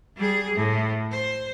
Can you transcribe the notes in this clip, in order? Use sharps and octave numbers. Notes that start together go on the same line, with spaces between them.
G3 G#4
A2
C5